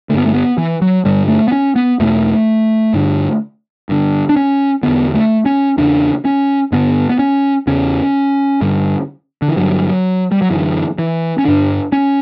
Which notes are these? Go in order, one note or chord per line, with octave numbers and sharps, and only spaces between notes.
G2 D3 A3 B3
A3
B3
E3
F#3
G2 D3 G3
A3
B3
C#4
B3
E2 B2 A3
G2 D3
G2 D3
D4
C#4
E2 D3 B3
A3
C#4
E2 C#3 D4
C#4
G2 D3 B3
B3
C#4
E2 C#3 C#4
G2 D3
D3
E3
G2 D3 F#3
G3
F#3
F#2 D3 E3
E3
C#4
G2 D3 D4
C#4